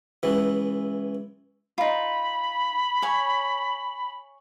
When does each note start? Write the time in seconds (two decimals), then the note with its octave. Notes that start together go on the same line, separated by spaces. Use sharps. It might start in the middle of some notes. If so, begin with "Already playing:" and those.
0.23 C#2 E3
1.78 D#4 F4 B5
3.02 C#5 G#5